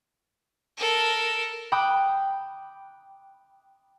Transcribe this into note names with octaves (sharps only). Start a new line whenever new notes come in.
A4 A#4
G5 B5 D6 D#6 F#6